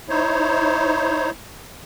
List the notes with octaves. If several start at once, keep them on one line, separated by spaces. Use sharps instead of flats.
D#4 E4 C5 C#5